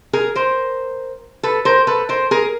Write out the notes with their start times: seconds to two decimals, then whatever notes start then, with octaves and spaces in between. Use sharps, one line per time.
0.13 G#4 A#4
0.35 A#4 C5
1.43 A4 B4
1.65 A#4 C5
1.87 A4 B4
2.09 A#4 C5
2.31 G#4 A#4